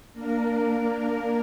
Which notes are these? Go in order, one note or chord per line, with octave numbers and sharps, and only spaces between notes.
A#3 D4 A#4